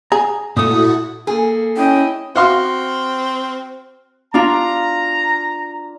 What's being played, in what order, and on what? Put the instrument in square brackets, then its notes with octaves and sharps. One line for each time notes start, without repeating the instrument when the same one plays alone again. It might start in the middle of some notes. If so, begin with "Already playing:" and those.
[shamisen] G#4 [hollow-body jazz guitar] A#5
[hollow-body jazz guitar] A#2 A3 [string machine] E4 F#4 A4 [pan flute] D#6
[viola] A#3 A4 [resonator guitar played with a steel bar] G#4
[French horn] C#4 [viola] E4 D#5 [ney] G5
[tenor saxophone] C4 [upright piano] F#4 F5 C6
[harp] D4 F4 [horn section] A#5